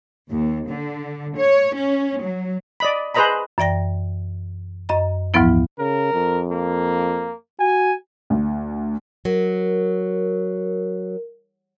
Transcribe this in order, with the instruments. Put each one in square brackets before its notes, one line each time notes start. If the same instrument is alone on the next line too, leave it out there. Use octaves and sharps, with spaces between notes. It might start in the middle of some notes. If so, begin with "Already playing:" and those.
[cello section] D#2
D3
C#5
C#4
F#3
[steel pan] D5 D#5 B5
G#4 B4 C5 D#5 A#5 B5
[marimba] F#2 E3 D5 G5 A#6
F#2 D#5 A#5
D2 G#2 E3 F3 B3 E4
[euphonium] C#3 [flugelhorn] A#4
[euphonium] F2
[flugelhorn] A#3
[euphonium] F#4 [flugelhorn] G#5
[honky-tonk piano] D2
[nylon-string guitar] F#3 [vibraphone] A#4